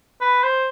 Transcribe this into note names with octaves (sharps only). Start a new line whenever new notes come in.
B4
C5